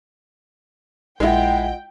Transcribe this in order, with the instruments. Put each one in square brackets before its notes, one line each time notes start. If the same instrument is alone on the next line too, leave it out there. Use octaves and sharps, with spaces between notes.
[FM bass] A#1 [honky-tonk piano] G#3 E4 [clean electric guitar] F4 D#5 F#5 [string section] G5